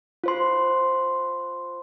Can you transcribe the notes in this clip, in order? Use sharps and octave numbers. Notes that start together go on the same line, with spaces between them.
F4 C5 C6